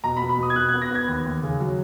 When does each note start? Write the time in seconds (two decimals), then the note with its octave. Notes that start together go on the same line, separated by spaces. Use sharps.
0.04 B2 A#5
0.17 B5
0.22 B2
0.29 B5
0.38 B2 D#6
0.50 G#6
0.56 B2 F#6
0.69 G#6
0.74 B3
0.82 A#6
0.91 B3 G#6
1.08 D#2
1.26 D#2
1.43 C#3
1.60 F#3